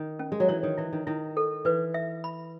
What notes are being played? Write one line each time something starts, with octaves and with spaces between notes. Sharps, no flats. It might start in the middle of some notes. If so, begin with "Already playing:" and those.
Already playing: D#3
C#4
G#3
F#3
E3 C#5
D#3
E3 E4
D#3
D#3 E4
A4
E3 B4
E5
B5